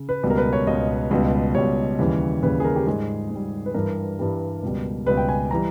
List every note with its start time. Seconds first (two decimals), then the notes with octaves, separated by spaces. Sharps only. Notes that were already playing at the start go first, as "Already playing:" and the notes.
Already playing: C#3
0.09 B4
0.23 C#2 B2 G3
0.30 A#4
0.38 B4
0.53 C#5
0.67 C#2 B2 G3 D#5
1.11 C#2 B2 G3
1.55 C#2 B2 G3 C#5
1.99 D#2 C#3 E3 G3
2.43 D#2 C#3 E3 G3 B4
2.60 G#4
2.65 A#4
2.76 G4
2.87 G#2 G3 G#4
3.31 G#2 G3
3.66 B4
3.74 G2 E3 G3 A#4
4.19 G2 E3 G3
4.63 C#2 B2 G3
5.06 C#2 B2 G3 B4
5.17 G5
5.29 G#5
5.51 E3 G3 A#5